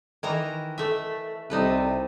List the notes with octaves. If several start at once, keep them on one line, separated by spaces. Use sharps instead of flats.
D#3 E3 A#5
A3 E5
C2 C3 D#4 A4 B4